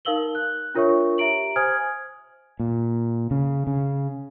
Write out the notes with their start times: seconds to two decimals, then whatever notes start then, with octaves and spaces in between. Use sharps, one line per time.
0.05 D#4 A#4 F5 E6 F#7 G7
0.35 F#6
0.75 D4 F4 A#4 C#5 E5 C#6
1.18 G4 E5 A#5 D7 F#7
1.56 C5 G#5 D#6 F6 G#6
2.60 A#2
3.31 C#3
3.67 C#3